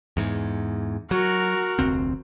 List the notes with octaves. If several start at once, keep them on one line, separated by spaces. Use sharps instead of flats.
E2 G#2
F#3 F#4 A#4
F1 D2 C4